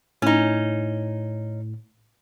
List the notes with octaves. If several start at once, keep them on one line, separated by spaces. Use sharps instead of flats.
A2 C#4 D#4